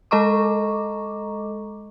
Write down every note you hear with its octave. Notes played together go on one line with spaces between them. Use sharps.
G#3 A4 D#5 A#5 C#6 D6